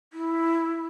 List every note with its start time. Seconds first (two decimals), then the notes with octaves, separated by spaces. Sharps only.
0.13 E4